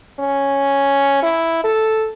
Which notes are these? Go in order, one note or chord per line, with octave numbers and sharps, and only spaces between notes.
C#4
E4
A4